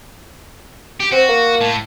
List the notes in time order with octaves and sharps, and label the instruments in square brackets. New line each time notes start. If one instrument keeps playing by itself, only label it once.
[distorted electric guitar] G4
[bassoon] C4 [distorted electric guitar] F#4
[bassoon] A#3
[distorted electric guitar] A2